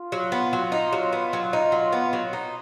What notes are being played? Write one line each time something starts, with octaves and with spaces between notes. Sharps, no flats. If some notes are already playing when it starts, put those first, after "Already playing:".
Already playing: F4
F#3
B3
F#3
D#4
F#3
B3
F#3
D#4
F#3
B3
F#3
D#4